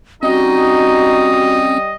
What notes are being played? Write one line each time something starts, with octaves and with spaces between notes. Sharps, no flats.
G3 C4 C#4 D#4 F#4 D#5